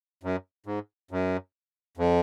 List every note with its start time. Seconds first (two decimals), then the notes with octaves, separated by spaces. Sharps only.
0.23 F#2
0.66 G#2
1.11 F#2
1.97 F2